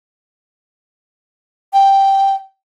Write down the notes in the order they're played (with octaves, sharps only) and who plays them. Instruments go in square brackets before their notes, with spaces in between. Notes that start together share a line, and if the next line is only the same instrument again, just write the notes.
[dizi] G5